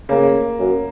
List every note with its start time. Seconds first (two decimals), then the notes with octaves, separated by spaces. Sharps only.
0.09 C#3 A#3
0.59 F#2